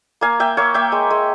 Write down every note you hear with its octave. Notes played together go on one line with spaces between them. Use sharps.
A#3 F5 G#5
A#3 E5 G5
A#3 C#5 F5
A#3 E5 G5
G#3
G#3